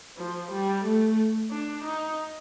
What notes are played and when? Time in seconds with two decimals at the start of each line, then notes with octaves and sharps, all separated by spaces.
0.17 F3
0.51 G3
0.84 A3
1.51 D4
1.84 D#4